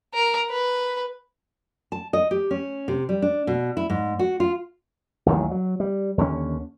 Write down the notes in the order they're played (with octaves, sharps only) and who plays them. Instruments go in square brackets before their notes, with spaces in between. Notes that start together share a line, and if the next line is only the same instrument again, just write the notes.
[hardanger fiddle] A#4
B4
[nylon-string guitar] A5
D#5
G4
C#4
C3
G3
D4
B2
E4
G#2
F#4
F4
[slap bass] A1 D#2 D#3 F#3
F#3
G3
D#2 D3 G#3 C#4